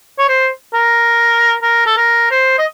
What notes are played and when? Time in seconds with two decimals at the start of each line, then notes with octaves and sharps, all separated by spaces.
0.18 C#5
0.28 C5
0.73 A#4
1.62 A#4
1.86 A4
1.97 A#4
2.31 C5
2.59 D#5